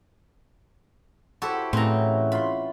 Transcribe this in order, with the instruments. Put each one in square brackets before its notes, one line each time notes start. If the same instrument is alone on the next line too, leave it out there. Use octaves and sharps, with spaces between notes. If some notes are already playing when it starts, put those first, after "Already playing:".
[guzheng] E4 G4 A4 [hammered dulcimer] F#4 C5
[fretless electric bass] A2 [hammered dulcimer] C#3 E3 [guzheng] C4 A#5
[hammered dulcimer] F4 C6 [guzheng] B5